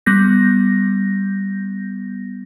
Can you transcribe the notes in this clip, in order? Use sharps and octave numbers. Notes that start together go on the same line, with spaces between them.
G3 B3 G6 A#6